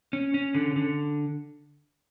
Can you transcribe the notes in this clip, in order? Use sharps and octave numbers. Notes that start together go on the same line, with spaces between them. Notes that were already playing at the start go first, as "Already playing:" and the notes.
C#4
C#4
D3
D3